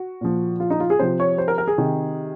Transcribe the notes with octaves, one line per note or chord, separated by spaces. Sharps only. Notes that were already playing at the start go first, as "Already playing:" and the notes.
Already playing: F#4
A#2 F3
F4
D#4
F4
G#4
C3 F3 C5
C#5
C5
A#4
A#4
G#4
C3 D#3